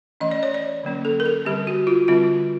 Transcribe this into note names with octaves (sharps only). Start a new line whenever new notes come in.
E3 A3 C#4 D#5
D5
C#5
D5
D3 F#3 A#3 C#4
A4
A#4
A4
D3 G3 C4 G4
F#4
F4
D3 G3 C4 F4